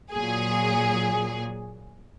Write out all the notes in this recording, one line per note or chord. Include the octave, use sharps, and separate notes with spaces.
A#2 F#3 G#4